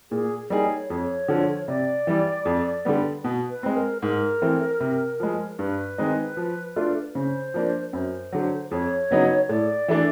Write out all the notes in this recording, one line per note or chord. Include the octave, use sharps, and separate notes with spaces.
A#2 G#4
G3 A#3 D#4 G#4
C#5
F2 C#5
D3 F3
C3 D5
E3 G3
F2
D3 G3 B3
B2
B4
G#3 C4
A#4
G#2 A#4
E3 A3 C4
C3
F3 G#3
G2 B4
D#3 G#3 C4 D#4
F3
A3 D4 F4
C#3 C5
F3 A#3 D4
F#2 C5
D3 F#3
F2 C#5
C#3 F#3 B3 D#4
A2 D5
E3 A3 D4